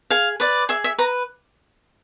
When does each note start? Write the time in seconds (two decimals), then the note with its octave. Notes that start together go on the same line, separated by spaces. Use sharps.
0.10 G#4 F5
0.40 B4 D5
0.69 G#4 E5
0.84 E5
0.98 B4 A#5